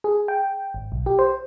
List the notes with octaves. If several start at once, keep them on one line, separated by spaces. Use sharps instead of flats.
G#4
G5
G#1
B1
G4
C5